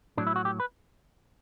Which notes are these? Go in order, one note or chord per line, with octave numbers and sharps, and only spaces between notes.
A2 F#3 D4
E4
F#4
G4
B4